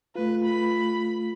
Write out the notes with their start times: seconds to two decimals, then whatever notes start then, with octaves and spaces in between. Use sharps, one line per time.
0.15 A3 F4 B4
0.44 B5